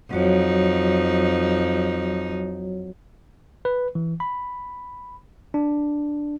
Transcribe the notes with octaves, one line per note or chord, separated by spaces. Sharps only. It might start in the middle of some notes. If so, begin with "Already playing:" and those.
F2 F#3 D#4 F#4 C#5
B4
E3
B5
D4